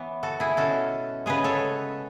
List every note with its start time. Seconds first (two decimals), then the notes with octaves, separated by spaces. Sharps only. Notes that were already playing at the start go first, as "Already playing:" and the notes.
Already playing: E3 B3 C#5
0.23 F#4 A4
0.40 E4 G#4
0.57 B2 G#3 C#4 F#4 A4
1.26 C#3 G#3 B3 G#4 B4
1.44 A4 C#5